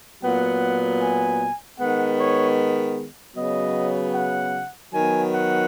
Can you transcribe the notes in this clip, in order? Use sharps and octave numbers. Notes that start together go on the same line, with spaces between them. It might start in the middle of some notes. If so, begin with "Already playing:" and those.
A#2 F#3 B3 F#5
G#5
D#3 G#3 B3 F#5
C#5
C#3 F#3 B3 D#5
F#5
D#3 F#3 B3 G#5
F#5